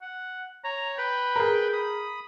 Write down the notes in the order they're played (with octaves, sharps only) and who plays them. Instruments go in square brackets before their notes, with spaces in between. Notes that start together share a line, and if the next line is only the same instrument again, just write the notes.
[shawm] F#5
[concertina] C#5 [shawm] A#5
[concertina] B4 B5 [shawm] G5
[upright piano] G#4 A#4
[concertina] B5 D#6